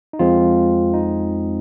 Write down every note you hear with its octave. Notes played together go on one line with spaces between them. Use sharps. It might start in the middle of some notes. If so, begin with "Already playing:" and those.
D#4
F2 F3 G#3 C4 F4
D#4